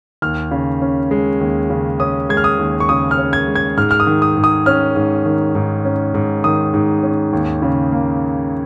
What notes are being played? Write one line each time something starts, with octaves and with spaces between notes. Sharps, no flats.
D#2 F6
C#3
C#4
G#3
D#2
C#3
C#4 D#6
G#3 G#6
F6
D#6
D#2
C#6
C#3 D#6
F6
C#4
G#6
G#3
G#6
G#2 F6
F6
D#6
D#3
D#6
G#2
D#6
C#4 F6
G#2
D#3
G#2
C#4
G#2
D#3 D#6
G#2
C#4
D#2
C#3
A#3